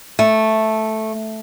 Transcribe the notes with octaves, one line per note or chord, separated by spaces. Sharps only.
A3